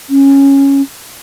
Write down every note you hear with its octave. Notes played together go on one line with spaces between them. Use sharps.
C#4